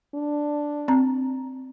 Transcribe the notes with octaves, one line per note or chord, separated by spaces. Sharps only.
D4
C4 A#5